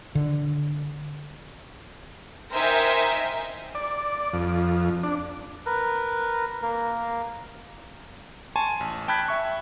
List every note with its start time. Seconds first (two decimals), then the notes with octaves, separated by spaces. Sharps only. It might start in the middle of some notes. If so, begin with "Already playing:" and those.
0.15 D3
2.52 D#4 A#4 C5 E5 G5 G#5
3.75 D5
4.33 F2
5.03 D4
5.66 A#4 B4
6.62 A#3 A#4
8.56 G#5 A5 C6 C#6
8.80 A1
9.08 G5 A5 B5 F#6 G#6 B6
9.28 E5 C#6